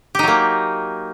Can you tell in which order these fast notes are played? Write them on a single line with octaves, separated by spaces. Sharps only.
G4 D#4 F#3 A#3